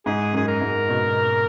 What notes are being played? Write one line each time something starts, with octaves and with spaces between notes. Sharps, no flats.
G#2 G#4
F#2 G#4
A#4
G#2
B2